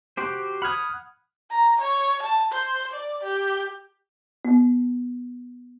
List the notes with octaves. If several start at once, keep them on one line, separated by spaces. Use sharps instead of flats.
F#4 G4 C5 C6 D6
F#5 B5 D#6 F6 G#6
A#5
C#5
A5
C5
D5
G4
B3